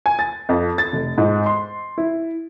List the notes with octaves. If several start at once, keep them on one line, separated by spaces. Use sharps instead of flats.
G#5
A6
F2
A6
F1
G#2
C6
E4